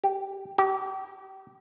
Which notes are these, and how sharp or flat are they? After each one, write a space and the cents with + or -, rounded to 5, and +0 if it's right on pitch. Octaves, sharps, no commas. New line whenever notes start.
G4 -10
G4 -35